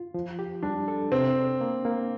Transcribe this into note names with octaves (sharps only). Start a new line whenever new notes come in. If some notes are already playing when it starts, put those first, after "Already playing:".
Already playing: F4
F3
G4
G3 D4
A4
C3 C4
D4
A#3
A#3